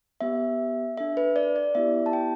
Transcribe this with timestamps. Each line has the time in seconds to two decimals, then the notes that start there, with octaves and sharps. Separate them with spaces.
0.21 B3 G4 E5
0.97 D4 A4 E5
1.17 B4
1.36 D5
1.56 D5
1.75 B3 E4 G4 E5
2.06 A5
2.13 G5